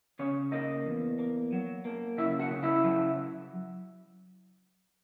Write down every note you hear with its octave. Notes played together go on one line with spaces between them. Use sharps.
C#3 C#4 C#5
A#3 D#4 D#5
E2
A#3
F#3
A#3
C#3 E4 E5
F#4 F#5
C#3
E4 E5
F#3